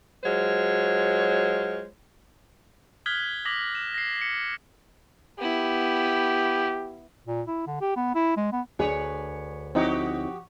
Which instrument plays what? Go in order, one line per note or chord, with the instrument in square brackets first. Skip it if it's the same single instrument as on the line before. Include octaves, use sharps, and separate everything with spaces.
[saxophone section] F#3 G#3 F4 C5 C#5
[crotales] D#6 F6 F#6 G#6 B6 G7
D6 D#6 A#6 B6 F#7
E7
A#6 C7
C#7
[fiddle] B3 E4 [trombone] G4
[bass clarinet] A#2
E4
D3
G4
B3
E4
G#3
B3
[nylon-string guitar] D2 G#4 [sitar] D4 B4 C#5
[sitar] F3 F#4 G4 [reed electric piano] C4 D#4 E4